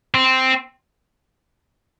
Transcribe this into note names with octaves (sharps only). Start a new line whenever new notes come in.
C4